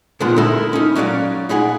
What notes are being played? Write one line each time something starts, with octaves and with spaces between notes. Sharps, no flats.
A#2 D3 D#3 F3 G#3 B3
D#4 E4 A4 A#4 E5
C#4 D#4
F#3 C#4 F#4 D5 F5
D#4 E4 G#4 F#5